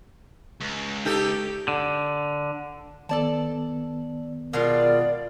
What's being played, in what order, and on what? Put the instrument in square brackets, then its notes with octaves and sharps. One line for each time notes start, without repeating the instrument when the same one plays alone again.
[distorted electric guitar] C#2
[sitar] D#4 G4 A4
[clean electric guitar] D3
[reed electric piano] D#3 B3 [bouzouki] A4 D5 A5
[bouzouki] B2 G#3 F4 [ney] A#4 [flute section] D5